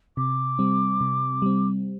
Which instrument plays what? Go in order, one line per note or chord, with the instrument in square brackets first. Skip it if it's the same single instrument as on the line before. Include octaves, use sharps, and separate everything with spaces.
[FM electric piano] C3 [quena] D6
[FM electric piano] G3 C4
C3
G3 C4